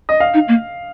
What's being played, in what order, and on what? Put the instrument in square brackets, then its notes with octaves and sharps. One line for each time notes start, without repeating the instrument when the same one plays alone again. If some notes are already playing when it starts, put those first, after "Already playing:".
[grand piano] D#5
F5
[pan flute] D#4
A#3